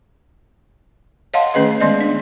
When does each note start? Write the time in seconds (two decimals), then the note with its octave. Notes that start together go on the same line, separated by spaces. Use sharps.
1.34 C#5 D#5 F5 F#5 A5 C6
1.54 D#3 A3 C#4 G#4 B4 D#5
1.80 D#3 G#3 B3 D5 D#5
2.00 D4